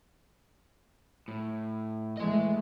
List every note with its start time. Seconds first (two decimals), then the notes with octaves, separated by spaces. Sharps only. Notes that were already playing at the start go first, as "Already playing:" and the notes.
1.28 A2
2.17 E3 G#3 A3 D#5